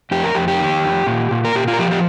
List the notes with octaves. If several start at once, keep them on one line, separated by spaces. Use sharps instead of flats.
F2 G4
A#4
F2 G4
G4
D#3
F2
A#2
A#2
A#4
A#2 G4
F4
A#4
F3 G4
G4